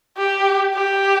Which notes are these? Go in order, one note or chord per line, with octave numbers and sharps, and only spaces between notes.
G4
G4